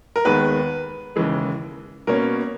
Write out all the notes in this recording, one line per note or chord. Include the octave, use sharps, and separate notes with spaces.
A#4
D#2 D#3 G#3 B3 B4
D#2 C#3 E3 G#3
B2 A#3 C#4 A#4